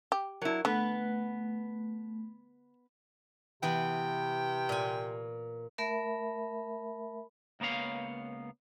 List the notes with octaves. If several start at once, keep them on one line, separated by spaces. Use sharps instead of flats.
G4
F#3 E4 A#4
D3 A3 B3 B4
C3 E3 B3 G5
A#2 G#5
A3 A#4 E5 B5
C#2 A#3 B3 C#5 F5